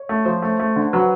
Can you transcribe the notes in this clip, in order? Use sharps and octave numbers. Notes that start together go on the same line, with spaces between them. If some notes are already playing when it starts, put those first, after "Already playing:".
Already playing: C#5
A3
F3 C5
A3
A3
D3
F#3 B4